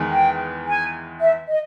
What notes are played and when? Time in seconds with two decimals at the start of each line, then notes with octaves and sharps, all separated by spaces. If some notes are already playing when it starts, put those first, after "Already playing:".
Already playing: E2 D#3 G#3 B3
0.11 G5
0.67 G#5
1.21 E5
1.49 D#5